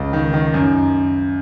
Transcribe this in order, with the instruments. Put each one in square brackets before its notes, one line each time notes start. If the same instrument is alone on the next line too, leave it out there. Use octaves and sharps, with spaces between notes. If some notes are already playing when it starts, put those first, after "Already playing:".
Already playing: [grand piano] C#2
D#3
D#3
F#2